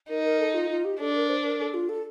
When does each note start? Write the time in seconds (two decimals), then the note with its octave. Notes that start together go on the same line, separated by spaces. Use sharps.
0.09 D#4 A#4
0.24 A#4
0.40 A4
0.54 F4
0.70 F4
0.85 G4
1.00 D4 A4
1.15 A#4
1.29 C5
1.44 A#4
1.60 A4
1.74 F4
1.89 A4